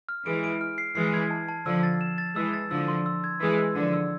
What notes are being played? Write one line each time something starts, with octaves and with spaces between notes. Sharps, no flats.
F6
E3 G#3 D7
D7
F6
C7
E3 G#3 C7
G#6
A5
A5
D3 F3 E6
A6
E7
A6
E3 G#3 E6
A6
D3 F3 E6
C6
E6
G#6
E3 G#3 E6
E6
D3 F3 E6
E6